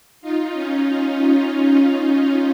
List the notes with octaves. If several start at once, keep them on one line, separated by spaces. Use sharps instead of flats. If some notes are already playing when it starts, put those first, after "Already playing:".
D#4 F4
C#4 D#4
C#4 D#4